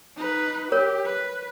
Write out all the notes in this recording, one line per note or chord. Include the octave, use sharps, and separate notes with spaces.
D#4 B4
G4 A#4 C#5
B4